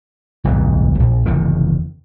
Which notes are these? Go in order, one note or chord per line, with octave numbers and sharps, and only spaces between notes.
D1 B1 F2 G#2
A#1
F#1 E2 C3 D#3